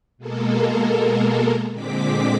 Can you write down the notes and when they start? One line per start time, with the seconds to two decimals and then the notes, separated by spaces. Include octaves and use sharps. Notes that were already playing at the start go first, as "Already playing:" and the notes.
0.18 B2 G#3 A#3 A4 A#4
1.72 A#2 D3 G#3 C4 D6 B6